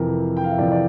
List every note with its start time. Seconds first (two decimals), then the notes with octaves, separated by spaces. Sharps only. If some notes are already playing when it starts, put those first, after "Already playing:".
Already playing: F2 C3 E3 A#4
0.37 G5
0.44 F5
0.51 E5
0.58 F2 C3 E3 D5
0.72 D5